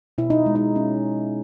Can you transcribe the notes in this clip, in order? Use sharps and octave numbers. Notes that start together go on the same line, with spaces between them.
B2 E4
D#4
G#3
D#4
C#4